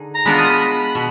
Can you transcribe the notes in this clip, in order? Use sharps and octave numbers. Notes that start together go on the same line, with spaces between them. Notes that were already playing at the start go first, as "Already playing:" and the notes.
Already playing: D3 D#4 G#4
A#5
G#3 B3 D4 F4 A#4 B5
D#6
B5
B5
B2